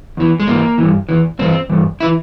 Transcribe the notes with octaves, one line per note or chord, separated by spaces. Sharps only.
E2 E3
G#3
G#2 E3 A#3
G2 E3
E2 E3
G2 E3 C4
G2 E3
E3 E4